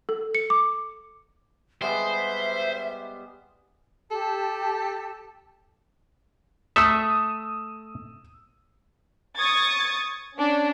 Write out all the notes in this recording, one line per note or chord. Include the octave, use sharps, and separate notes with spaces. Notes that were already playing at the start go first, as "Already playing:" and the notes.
A4
C#7
D6
G3 G#3 B3 C5 E5
G4 A4 A5
A3 A4 E5 D#6 E6
C#6 D#6 G#6 A6
C#4 D4